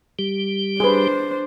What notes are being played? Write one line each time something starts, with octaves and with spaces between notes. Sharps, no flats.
G3 G4
D4 G#4 B4 C5